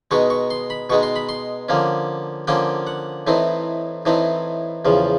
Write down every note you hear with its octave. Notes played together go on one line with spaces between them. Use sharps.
B2 G#3 B3 D#4 C#6
C#6
C6
B5
B2 G#3 B3 D#4 C#6
C6
B5
C6
D3 F3 A#3 C#4
D3 F3 A#3 C#4 G5
F#5
A2 E3 A3 C4 D#4
A2 E3 A3 C4 D#4
E2 C#3 F3